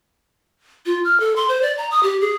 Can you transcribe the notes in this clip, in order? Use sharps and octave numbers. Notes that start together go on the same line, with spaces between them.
F4
F6
A4
C6
C5
D5
A#5
D#6
G4
G#4